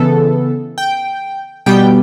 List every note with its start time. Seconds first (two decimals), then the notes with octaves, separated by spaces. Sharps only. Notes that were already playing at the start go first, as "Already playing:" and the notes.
Already playing: C#3 E3 B3 A4
0.78 G5
1.66 B2 G3 B3 G5